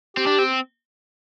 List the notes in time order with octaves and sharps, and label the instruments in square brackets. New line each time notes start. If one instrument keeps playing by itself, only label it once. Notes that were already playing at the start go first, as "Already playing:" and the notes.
[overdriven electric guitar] C4 [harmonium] G4
[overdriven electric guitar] D4
C4